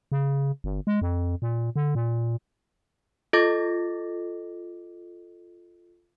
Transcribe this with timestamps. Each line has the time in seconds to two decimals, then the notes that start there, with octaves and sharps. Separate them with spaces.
0.12 C#3
0.64 G1
0.87 G#3
1.02 F2
1.42 A#2
1.76 D3
1.95 A#2
3.33 F4 A4 D#5 D6 A6 A#6